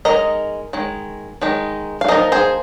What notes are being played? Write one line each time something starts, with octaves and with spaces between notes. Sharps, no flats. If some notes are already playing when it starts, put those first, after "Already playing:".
G#3 D#4 A#4 D#5
D#3 G#3
D#3 G#3 D#4
F5
F3 A#3 D#4 A#4 D#5
G#4 C5